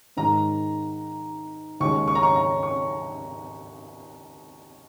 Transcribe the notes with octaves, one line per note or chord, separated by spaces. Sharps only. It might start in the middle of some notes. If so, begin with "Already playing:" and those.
G#2 D#3 G#3 A#5
D#2 C#3 G#3 C#6
C#6
A#5
C#6
A#5
C#6